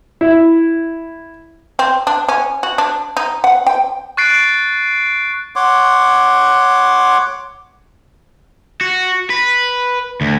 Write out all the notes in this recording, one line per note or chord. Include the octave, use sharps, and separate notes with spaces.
E4
C4
D4
C#4
F#4
D4
D#4
F#5
G5
C#6 F#6 A6 C7 D7
C#5 F#5 C6 D6
F#4
B4
D2